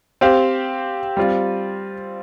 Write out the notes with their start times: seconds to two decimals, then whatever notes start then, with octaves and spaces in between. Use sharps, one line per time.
0.21 C4 G4 C5 F5
1.17 G3 C4 F4